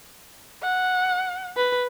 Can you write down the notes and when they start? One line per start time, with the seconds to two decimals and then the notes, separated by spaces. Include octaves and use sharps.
0.63 F#5
1.57 B4